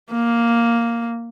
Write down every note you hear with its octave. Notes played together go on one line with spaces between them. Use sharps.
A#3